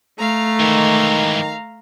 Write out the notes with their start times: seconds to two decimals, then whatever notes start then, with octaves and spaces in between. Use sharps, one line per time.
0.19 A3 F5 A#5
0.60 G#2 D#3 E3